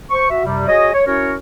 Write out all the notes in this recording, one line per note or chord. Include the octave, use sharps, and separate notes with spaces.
C5 C#6
F#4 E5
F#2 C3 G3
F#4 G#4 C#5 D#5
C#5
C#4 E4 F#4 A#4 C#5